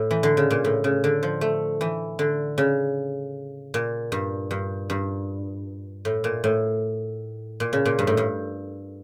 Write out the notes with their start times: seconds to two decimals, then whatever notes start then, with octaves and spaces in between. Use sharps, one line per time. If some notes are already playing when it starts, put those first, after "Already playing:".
Already playing: A2
0.11 E3
0.23 D3
0.37 C#3
0.50 A#2
0.64 A2
0.84 C#3
1.04 D3
1.23 F3
1.41 A3
1.81 E3
2.19 D3
2.58 C#3
3.74 A#2
4.12 G2
4.51 G2
4.90 G2
6.05 A2
6.24 A#2
6.44 A2
7.60 A#2
7.73 C#3
7.86 A#2
7.99 G2
8.07 A2
8.17 G2